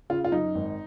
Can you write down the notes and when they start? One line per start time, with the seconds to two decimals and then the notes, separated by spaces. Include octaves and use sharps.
0.10 C#3 F4
0.24 F4
0.32 F#2 D#4
0.55 G#1